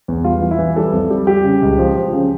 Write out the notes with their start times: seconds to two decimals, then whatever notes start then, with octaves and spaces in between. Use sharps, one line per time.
0.08 E2
0.24 G3 F4
0.41 E3
0.51 E4
0.59 E3
0.76 G3 A4
0.93 F2
1.10 G3
1.27 G3 G4
1.44 C#3
1.62 C#2
1.78 F3
1.96 F3
2.13 C#3